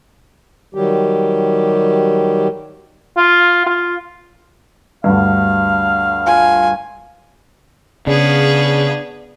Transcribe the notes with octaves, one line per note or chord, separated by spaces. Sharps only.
D#3 F#3 G3 G4
F4
F4
D2 G2 F5
F4 G#5
C#3 B3 D4 G#4